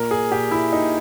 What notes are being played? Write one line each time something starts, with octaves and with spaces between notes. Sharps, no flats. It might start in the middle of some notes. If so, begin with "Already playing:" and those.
Already playing: A#2 A#4
G#4
A#2 G4
E4
A#2 D#4